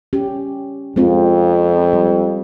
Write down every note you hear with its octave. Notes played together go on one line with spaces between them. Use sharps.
C#4 G4
F2 G#3 C4 F4
G3